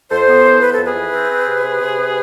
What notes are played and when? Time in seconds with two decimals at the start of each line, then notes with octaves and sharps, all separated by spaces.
0.10 F2 A4 C5
0.28 B3
0.45 E3
0.61 B3 B4
0.72 A4
0.78 F2
0.85 G#4 B4
0.95 E3
1.12 C4
1.29 C4
1.46 C3
1.63 C3
1.80 C3
1.98 C3